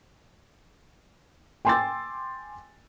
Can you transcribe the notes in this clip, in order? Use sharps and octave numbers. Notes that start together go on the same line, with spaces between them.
G5 G#5 C6 D6 E6 A6